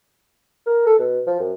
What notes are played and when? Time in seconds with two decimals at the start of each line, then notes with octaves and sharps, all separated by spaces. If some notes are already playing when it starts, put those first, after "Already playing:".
0.67 A#4
0.86 A4
0.99 B2
1.27 F3
1.40 F#2